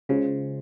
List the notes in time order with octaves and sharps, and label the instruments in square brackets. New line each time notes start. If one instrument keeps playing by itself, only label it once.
[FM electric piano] C#3 [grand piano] G#3 C#4 F4 C5